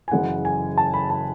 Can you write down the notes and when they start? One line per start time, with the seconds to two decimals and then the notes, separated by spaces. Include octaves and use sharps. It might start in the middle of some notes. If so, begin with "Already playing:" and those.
0.08 G#5
0.11 F#1 F#2 C#3 E3 F#5
0.45 G#5
0.78 A5
0.94 B5
1.10 A5